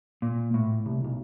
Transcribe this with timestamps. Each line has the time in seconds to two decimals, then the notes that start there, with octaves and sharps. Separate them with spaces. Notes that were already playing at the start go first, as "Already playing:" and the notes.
0.22 A#2
0.54 A2
0.86 C2
1.05 B1